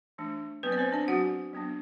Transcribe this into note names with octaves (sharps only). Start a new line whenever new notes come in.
E3 A3 D4
F#3 B3 C4 B4
D5
C4 C5
D4 D5
F#3 C4 F#4 F#5
F#3 B3 D4